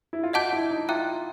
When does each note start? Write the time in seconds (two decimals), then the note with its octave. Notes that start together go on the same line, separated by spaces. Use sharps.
0.13 E4
0.23 F4
0.33 F#4 D#5 F#5 A5 D6 G6
0.53 E4
0.71 D#4
0.89 F4 E5 G5 A#5 D6 F#6